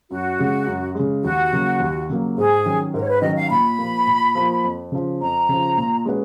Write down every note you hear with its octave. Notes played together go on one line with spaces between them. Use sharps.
F#2 F#4
C#3 G#3
F#2
C#3 G#3
D#2 F#4
C#3 F#3 A#3
D#2
C#3 F#3 A#3
G#2 G#4
D#3 F#3 C#4
G#2 A#4
C#5
B4
D#3 F#3 C#4 D#5
F5
A#2 B5
F3 A#3
A#2
F3 A#3
F2
C#3 F3
F2 A#5
C#3 F3
A#2
G#3 C#4 F#4 B4